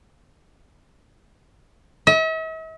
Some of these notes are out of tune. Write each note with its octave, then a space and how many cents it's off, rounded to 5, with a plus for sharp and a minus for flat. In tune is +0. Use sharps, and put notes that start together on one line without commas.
E5 -45